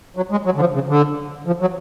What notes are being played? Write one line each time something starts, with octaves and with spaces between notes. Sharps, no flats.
F#3
G#3
F#3
D3
F3
C#3
D3
F3
F#3